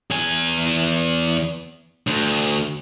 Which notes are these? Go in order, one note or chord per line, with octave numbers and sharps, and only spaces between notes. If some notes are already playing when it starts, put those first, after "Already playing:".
E2 G#5
D2